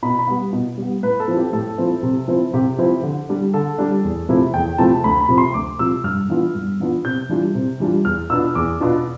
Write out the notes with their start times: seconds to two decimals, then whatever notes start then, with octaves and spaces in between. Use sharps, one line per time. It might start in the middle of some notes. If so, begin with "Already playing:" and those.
0.03 B2 B5
0.19 B5
0.28 G3 B3
0.53 B2
0.78 G3 B3
1.03 A2 B4
1.20 A4
1.28 F3 C4 E4
1.37 G4
1.53 A2 A4
1.78 F3 C4 E4
2.03 C3
2.28 F3 C4 E4
2.53 C3 G4
2.78 F3 C4 E4
3.03 D3
3.29 G3 D4
3.54 D3 A4
3.78 G3 D4
4.04 E2
4.29 C3 F3 A3 E4
4.54 E2 G5
4.78 C3 F3 A3 E4 A5
5.04 D2 B5
5.21 B5
5.29 C3 F3
5.38 C6
5.54 D2 D6
5.79 C3 F3 E6
6.04 G2 F6
6.29 E3 B3 D4 F4
6.55 G2
6.80 E3 B3 D4 F4
7.05 C3 G6
7.29 E3 G3 D4 F4
7.55 C3
7.80 E3 G3 D4 F4
8.05 E2 F6
8.30 B2 B3 D4 F4 E6
8.55 E2 D6
8.80 B2 B3 D4 F4